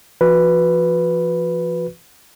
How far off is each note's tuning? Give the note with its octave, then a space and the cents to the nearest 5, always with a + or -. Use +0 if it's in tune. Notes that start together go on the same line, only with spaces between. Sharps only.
F3 -40 F#4 -25 B4 +0